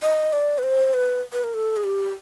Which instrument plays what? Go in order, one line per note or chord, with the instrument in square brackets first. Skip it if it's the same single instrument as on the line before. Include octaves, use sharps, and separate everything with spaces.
[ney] D#5
D5
B4
C5
B4
B4
A#4
A4
G#4
G4